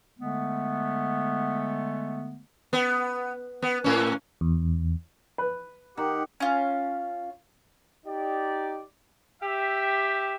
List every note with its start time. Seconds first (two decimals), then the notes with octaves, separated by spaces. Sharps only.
0.19 D3 G#3 A3 B3
2.73 B3
3.62 B3
3.84 A2 C#4
4.41 E2
5.38 B4
5.97 D#3 G4 F#5
6.40 C#4 F4
8.06 D#4 G4 D5
9.42 G4 E5